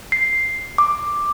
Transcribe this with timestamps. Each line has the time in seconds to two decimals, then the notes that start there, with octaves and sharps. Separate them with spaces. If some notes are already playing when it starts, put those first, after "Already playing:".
0.12 C7
0.78 D6